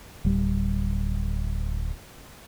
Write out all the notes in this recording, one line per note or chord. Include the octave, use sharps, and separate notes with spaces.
D1 G3